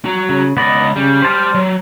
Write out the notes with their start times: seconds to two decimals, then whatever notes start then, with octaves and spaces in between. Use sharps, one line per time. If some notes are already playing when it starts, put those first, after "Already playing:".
0.05 F#4 A#5
0.29 C#3
0.57 C#2 B3 D5 D#5 B5
0.96 C#3 G3
1.22 C5 A5 F6
1.55 F#3